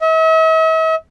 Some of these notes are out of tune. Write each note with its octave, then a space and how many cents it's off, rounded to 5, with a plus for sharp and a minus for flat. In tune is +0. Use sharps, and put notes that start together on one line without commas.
E5 -45